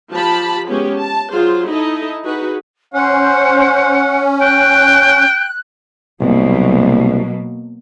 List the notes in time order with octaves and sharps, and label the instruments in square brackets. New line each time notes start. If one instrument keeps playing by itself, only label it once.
[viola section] F3 G4 A5 B5
G#3 B3 C#4 G4 G#4
A5
F#3 F4 G#4 C5
D#4 E4 A4 D#5
D#4 F#4 G#4 B4
[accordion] C#4 [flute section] C5 [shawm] F#5
[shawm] G5 [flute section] F#6
[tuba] C2 [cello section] B2 F#3 A#3